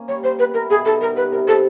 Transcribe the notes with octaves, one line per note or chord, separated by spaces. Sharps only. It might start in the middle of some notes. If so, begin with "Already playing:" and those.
Already playing: A#3 C#4
G3 C#5
G3 C5
B3 B4
E4 A#4
B2 G#4
D#4 A4
G3 A#4
B3 B4
C3 A#4
C3 A4